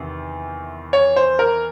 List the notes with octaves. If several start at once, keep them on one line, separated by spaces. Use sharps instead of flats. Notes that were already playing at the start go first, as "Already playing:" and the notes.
Already playing: E2 C3 D#3
C#5
C5
A#4